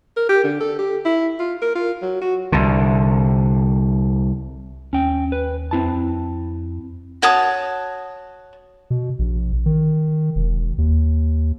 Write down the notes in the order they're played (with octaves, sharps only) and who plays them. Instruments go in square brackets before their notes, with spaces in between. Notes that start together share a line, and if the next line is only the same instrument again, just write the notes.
[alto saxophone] A#4
G4
D3
A4
G4
E4
F4
A#4
F4
F#3
F#4
[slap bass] C2 D3
[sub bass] D#2 [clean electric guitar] C#4 G5
[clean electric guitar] B4
[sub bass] F2 [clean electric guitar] C4 E4 A5
[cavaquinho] F#4 C#5 A5 D#6
[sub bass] B2
A#1
D#3
E1
D#2